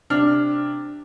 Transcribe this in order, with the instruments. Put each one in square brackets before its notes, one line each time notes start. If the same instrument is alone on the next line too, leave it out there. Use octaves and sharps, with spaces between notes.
[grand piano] C3 D4 F6